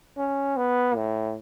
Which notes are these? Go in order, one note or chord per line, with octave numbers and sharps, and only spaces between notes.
C#4
B3
A2